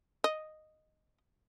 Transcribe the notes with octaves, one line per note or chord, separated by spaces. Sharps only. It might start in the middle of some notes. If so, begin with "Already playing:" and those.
D#5